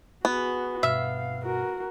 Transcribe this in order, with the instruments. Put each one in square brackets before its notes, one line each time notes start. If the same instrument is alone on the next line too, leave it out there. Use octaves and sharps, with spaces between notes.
[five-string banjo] B3 [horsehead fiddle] F#4 G#4
[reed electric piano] G2 B2 F6 [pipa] E5 [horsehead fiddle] F5
[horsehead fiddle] F#4 A#4